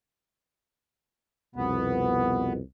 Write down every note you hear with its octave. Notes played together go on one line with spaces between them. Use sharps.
C2 F2 B2 B3